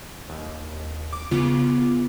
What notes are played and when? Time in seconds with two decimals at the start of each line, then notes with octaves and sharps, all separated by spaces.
0.30 D#2
1.13 D6
1.31 C#3 B3 F4 D6